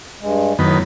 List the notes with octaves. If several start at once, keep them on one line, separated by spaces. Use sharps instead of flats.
G2 G#3
F#2 A2 D#3 B3